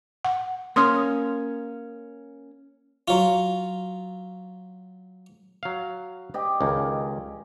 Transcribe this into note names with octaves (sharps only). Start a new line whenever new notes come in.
F#5
A#3 C#4 C6 D#6 F6
F#3 F4
F#3 F5
G4 D5 D#5
C#2 D#3 C#4